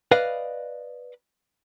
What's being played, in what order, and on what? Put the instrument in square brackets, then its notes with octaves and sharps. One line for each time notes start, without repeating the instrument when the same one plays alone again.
[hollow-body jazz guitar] B4 D5 D#5 F5